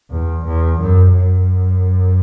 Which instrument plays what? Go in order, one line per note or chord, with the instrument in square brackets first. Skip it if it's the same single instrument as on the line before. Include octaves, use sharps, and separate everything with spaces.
[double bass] E2
E2
F#2
F#2